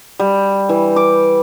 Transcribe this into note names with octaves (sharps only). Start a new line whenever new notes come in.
G3
E3
D6